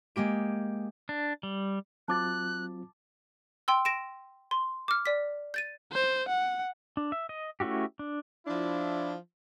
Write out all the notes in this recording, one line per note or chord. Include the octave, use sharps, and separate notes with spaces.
G#3 A#3 G4 D7
D4
G3
F#3 C4 F4 A5 D6 F#6 A6
G5 C6 E6
A#6 D7 E7
C6
D6 F6
D5 B6
G6 A6 D#7
C5
F#5
D4
E5
D#5
A3 C#4 E4 F#4 G4
D4
F3 D4 E4